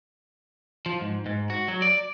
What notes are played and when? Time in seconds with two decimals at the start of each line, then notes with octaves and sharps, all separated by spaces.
0.86 F3
1.01 G#2
1.26 G#2
1.50 F#4
1.68 F#3
1.82 D5